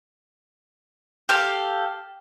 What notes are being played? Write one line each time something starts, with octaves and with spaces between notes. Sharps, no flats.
G4 A4 F5